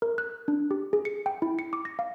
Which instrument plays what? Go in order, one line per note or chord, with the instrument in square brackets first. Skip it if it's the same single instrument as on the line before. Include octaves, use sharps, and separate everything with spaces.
[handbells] A#4
F#6
D4
G4
G#4
C#7
G5
E4
C#7
D6
A#6
F5